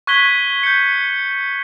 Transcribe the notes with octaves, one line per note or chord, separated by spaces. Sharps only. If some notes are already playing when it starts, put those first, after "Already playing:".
C#6 F#6 G#6 B6 G7
G6 C#7
C#7